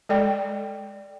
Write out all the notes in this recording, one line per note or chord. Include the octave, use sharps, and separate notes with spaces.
G#3 A4 D5 G5